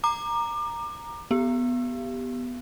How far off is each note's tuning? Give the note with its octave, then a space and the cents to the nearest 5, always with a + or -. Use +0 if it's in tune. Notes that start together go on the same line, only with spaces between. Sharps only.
A#5 +0 D6 +30
B3 +0 G4 +0